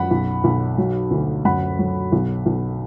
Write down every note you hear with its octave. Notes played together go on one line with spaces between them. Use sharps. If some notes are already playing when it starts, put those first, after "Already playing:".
Already playing: F#2 F#5 B5
B1
B1
F#3
D2
F#2 F#5 B5
F#3
B1
B1